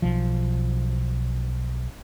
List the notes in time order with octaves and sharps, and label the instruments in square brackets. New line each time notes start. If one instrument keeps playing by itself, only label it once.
[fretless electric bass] B1 F3